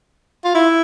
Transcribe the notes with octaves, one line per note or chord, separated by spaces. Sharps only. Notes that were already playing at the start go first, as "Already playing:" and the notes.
F4
E4